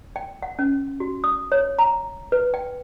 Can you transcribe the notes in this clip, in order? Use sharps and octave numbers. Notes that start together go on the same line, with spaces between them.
G5
F#5
C#4
F#4
D#6
C#5
A#5
B4
G5